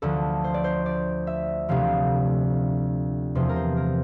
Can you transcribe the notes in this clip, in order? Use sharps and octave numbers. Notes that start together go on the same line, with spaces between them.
D2 D3 F3 A4
C5
D5
C5
D5
E5
D2 C3 F3 F5
E2 C3 F3 C5
A#4
C5
A#4